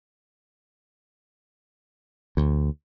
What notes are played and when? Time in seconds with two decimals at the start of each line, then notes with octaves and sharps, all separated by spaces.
2.37 D2